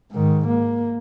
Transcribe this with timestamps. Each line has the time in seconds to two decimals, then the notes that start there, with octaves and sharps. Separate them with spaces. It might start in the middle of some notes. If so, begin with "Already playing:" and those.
0.12 G#2 D#3
0.47 A#3